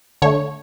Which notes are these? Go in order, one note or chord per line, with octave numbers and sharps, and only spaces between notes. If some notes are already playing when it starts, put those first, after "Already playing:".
D3 A3 C#5